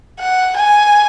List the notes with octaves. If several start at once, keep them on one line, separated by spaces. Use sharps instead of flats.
F#5
G#5